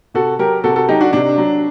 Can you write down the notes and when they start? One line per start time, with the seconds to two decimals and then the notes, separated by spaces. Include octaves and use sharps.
0.14 C3 F#4 A4
0.39 F#3 G4 A#4
0.64 C3 F#4 A4
0.76 F#4 A4
0.89 F#3 D#4 G4
1.01 D4 F#4
1.13 C3 D4
1.38 F#3